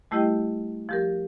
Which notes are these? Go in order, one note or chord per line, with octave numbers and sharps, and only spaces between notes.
G3 A3 E4 G4 D#5 G5
F3 G4 A#4